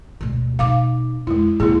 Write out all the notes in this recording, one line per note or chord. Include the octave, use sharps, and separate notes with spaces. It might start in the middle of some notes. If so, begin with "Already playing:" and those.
D2 B2
B2 D#4 F5 D6
F2 G#3 E4
D#2 C3 E4 G#4